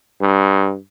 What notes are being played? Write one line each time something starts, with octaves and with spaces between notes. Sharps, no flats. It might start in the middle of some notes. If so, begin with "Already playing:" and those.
G2